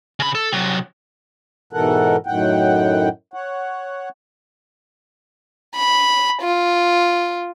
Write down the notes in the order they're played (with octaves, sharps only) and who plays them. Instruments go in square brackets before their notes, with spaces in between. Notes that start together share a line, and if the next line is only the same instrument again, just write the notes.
[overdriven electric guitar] C#3 B5
A4
C3 F#3
[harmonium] G#2 B2 E3 A4 A#4 F#5
F#2 A2 D#3 F#5 G5
C#5 F#5
[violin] B5
F4